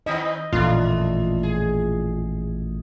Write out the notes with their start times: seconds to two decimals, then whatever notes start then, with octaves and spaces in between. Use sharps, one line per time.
0.06 D#3 C4 D#4 D#5
0.52 A1 F2 A#2 A3 A#3 D4 F4
1.43 G#4